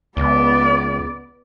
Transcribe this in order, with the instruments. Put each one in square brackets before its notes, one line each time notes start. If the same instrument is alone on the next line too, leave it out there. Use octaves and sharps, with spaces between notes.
[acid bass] C#2 [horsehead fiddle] B3 D5